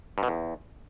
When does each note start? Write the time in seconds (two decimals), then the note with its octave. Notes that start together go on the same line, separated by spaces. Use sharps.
0.18 G2
0.23 B2
0.28 E2